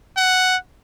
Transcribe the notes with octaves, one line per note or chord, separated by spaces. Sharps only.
F#5